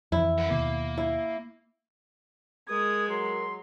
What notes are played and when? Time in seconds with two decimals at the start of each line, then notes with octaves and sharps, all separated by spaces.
0.12 F2 E3 E4
0.38 A#4 F#5
0.50 D#2 B2 A#3
0.97 E4
2.69 G#3 A#4 D#6 G#6
3.10 F#3 A#4 C6